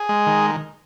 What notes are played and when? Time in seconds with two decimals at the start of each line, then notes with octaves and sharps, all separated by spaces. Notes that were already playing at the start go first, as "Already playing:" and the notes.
Already playing: G#4
0.09 G#3
0.27 D#3